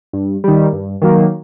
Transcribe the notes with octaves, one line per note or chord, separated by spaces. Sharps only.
G2
D#3 G3
G2
D#3 F#3 A#3